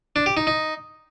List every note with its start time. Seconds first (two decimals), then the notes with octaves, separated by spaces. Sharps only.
0.16 D4
0.26 G4
0.37 D#4
0.47 D#4